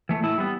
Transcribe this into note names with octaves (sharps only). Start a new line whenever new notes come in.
E3 A3
A2 E4
G3 B3